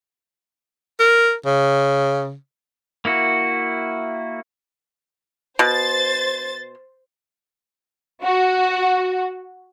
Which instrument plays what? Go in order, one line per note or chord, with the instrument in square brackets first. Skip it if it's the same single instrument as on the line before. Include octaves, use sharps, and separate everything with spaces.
[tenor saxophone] A#4
C#3
[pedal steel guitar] A#3 E4 F#4
[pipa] B2 [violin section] C5 A6
[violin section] F#4